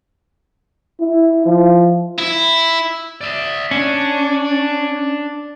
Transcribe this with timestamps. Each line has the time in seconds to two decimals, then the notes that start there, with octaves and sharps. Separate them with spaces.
1.00 E4
1.45 F3
2.18 E4
3.21 D5 E5
3.71 C#4 D4